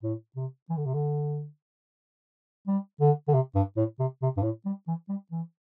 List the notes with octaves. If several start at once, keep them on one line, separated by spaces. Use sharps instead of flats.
A2
C3
E3
D3
C3
D3
G3
D3
D3
C3
G2
A2
C3
C3
G2
A2
G3
E3
G3
E3